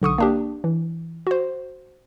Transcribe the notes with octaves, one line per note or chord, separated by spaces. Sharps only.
B1 D3 C#6 D#6
A#3 D4 G4
E3
F#4 C5